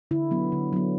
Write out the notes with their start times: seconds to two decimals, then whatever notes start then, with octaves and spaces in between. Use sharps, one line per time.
0.11 D3 E4
0.31 F#3 B3
0.52 D3
0.73 F#3 B3